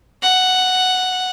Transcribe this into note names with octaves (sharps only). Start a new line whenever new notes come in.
F#5